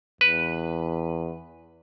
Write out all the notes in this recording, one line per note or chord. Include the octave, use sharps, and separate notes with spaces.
E2 B4